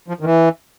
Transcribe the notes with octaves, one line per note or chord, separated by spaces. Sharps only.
F3
D#3
E3